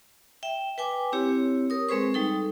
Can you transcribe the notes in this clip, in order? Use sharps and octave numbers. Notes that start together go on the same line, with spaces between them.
E5 G5
B4 G5 G#5 D6
C4 E4 G4 C#5
A#4 D#6
G#3 C4 G#4 B4 C5 C#6
G3 D#4 A4